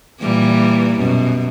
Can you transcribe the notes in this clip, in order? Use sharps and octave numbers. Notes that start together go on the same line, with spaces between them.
A#2 E3 G3
F#2 B2